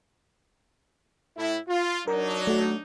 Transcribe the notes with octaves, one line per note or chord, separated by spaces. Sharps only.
A2 E4
F4
F#3 D4 D#4 A#4
A3 F#4